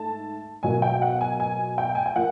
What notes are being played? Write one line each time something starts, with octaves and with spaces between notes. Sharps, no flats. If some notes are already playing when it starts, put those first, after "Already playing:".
Already playing: G#2 A3 A5
B2 F#3 A#3 G#5
G5
F#5
G#5
G#5
G5
G#5
G5
F3 A#3 F#5